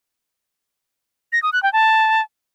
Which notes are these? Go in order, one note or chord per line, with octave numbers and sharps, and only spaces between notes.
A#6
D#6
F#6
G5
A5